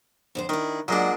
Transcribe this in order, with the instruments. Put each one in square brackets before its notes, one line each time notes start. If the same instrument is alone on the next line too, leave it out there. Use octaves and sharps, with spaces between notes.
[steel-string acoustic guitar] F2 D3 C5
[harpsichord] D#3 [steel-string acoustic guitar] D4 E4
[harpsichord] A#2 G#3 D4 [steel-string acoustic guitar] F#3 F#5